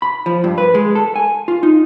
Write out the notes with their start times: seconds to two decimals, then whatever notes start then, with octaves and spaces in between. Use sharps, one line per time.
0.02 B5
0.26 F3
0.44 G2
0.58 B4
0.75 G#3
0.95 A4
1.16 G#5
1.48 F4
1.63 D#4